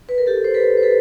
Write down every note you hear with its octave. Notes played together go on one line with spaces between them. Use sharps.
B4
A#4
G4 A4
C5
A4 B4
C5
A4 B4